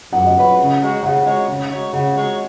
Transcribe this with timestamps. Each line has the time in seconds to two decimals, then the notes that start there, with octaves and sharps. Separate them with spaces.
0.13 F#2 F#5
0.26 D#5
0.35 F#3 C#4 B4 F#5
0.57 C#3
0.81 G#3 D#4 F#4 C#5
1.03 C#3 F#5
1.25 G#3 D#4 F#4 C#5
1.48 C#3
1.71 G#3 D#4 F#4 C#5
1.93 C#3 F#5
2.15 G#3 D#4 F#4 C#5